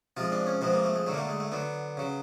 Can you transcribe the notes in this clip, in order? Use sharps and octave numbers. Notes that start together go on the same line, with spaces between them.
C3 F3 G#3 F4
D4
C#4
C3 F3 G#3 B3
A#3
A3
G#3
D3 F#3 A3
A#3
A3
G#3
A3
D3 F#3 B3
C#3 F#3